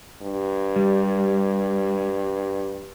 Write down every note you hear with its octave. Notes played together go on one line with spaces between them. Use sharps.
G2
G3